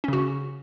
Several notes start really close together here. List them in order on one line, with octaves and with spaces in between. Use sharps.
C#4 C#3 F#4